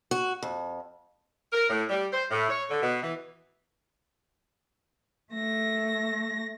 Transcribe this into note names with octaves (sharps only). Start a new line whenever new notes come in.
F#4
F2
A#4
A2
G3
C5
A2
C#5
D3
B2
E3
A3 A#6